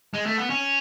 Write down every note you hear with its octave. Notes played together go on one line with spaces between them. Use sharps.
G#3
A3
B3
C#4